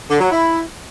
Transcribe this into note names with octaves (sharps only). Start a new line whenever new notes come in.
D3
F#3
E4